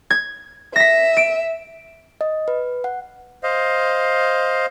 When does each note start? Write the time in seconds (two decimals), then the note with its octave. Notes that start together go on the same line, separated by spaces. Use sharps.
0.10 G#6
0.76 E5 A#6 B6
1.17 D7
2.21 D#5
2.48 B4
2.84 F#5
3.43 C5 D#5 F5